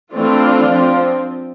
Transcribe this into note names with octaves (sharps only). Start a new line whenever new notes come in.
E3 A3 C4 D4 F4
F3 C4